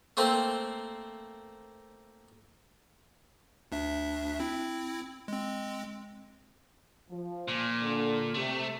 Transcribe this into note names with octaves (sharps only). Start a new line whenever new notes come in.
A3 A#3 C4 C5
D2 D4 E5
C4 E4
G#3 C4
F3
A#2
D3
C3 A3